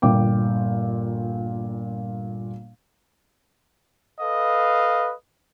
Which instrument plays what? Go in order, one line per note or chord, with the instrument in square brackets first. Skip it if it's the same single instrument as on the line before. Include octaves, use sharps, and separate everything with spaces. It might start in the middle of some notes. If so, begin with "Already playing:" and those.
[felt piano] G1 A#2 G5 D6
[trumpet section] A4 B4 D#5 F5